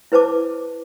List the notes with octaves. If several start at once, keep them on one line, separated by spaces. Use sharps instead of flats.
E4 B4 C5 A5 D6